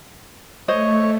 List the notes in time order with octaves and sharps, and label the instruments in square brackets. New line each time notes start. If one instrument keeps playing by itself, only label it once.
[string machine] A3 [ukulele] C5 D#5 [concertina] C#5